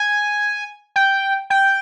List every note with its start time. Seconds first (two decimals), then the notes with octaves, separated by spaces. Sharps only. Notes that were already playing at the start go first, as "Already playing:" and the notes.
Already playing: G#5
0.96 G5
1.50 G5